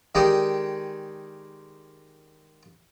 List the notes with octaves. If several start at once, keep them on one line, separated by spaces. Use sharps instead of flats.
D#3 G#3 G4 G#4 D5